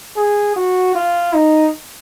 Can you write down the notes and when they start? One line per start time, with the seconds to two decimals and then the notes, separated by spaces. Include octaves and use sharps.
0.16 G#4
0.56 F#4
0.95 F4
1.34 D#4